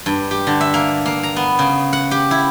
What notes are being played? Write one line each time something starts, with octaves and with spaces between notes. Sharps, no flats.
G2
G4
D3
E5
A#3
A#3
A#5
B3
C#3
F#5
G4
E4